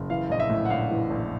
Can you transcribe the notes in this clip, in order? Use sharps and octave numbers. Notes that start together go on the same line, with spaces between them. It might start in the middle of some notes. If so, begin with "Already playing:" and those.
Already playing: F#1
E3 F5
A#1 D#5
E5
A2
F#5
A#1 F5
E3
A#1